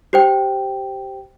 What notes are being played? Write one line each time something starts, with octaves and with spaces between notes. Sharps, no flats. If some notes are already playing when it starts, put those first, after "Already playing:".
G4 C5 G5